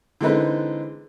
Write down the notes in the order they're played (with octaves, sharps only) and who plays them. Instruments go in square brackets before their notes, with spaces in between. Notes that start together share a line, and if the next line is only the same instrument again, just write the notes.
[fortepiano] D3 E3 G#3 C4 D#4 B4